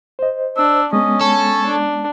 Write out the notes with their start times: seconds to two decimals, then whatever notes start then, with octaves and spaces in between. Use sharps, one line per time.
0.19 C5 D#5
0.57 D4 E6
0.93 G#3 B3 C#4 D#5
1.21 A4 C#5
1.66 D4